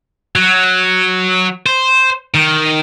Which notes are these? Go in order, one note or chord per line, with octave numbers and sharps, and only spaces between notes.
F#3
C5
D#3